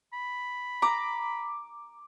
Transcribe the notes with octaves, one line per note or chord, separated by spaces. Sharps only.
B5
A#5 D6